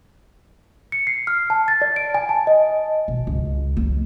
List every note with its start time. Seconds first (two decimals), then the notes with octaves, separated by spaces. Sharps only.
0.92 C#7
1.07 C7
1.27 F6
1.50 A5
1.68 A6
1.82 D5
1.96 D7
2.14 G#5
2.29 A5
2.47 D#5
3.08 B1
3.27 C#2
3.77 F2